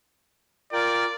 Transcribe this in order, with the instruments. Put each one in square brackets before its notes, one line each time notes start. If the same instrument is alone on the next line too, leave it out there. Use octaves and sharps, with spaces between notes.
[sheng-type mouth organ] F4 A#4 G5 [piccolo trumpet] D5